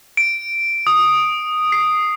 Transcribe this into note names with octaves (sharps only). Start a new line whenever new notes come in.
D7
D#6
C7